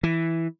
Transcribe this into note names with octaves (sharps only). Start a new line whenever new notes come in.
E3